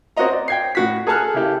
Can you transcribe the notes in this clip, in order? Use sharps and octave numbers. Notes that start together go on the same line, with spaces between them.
C4 F#4 C#5 D#5 A#5
D5
G5 G#6 C7
A2 F#4 B6
G#4 A4 G#5 A5 F6 F#6
C#3 A#3 E4 G4